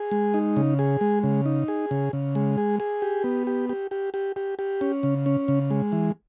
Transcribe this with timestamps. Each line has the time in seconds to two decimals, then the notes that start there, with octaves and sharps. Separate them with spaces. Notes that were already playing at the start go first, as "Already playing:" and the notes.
Already playing: G#4
0.11 G#3
0.34 D#4
0.56 C#3
0.79 G#4
1.01 G#3
1.24 C#3
1.46 D#4
1.68 G#4
1.91 C#3
2.13 C#3
2.35 G#3
2.58 G#4
2.80 G#4
3.02 G4
3.24 B3
3.47 G4
3.69 G4
3.91 G4
4.14 G4
4.36 G4
4.59 G4
4.81 C#4
5.03 C#3
5.26 C#4
5.48 C#3
5.71 G#3
5.92 E3